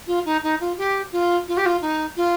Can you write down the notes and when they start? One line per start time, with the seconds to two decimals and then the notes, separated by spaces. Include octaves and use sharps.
0.07 F4
0.25 D#4
0.43 D#4
0.60 F4
0.77 G4
1.12 F4
1.48 F4
1.57 G4
1.66 F4
1.81 D#4
2.16 F4